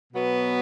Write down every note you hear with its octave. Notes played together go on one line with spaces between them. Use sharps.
B2 F#3 B3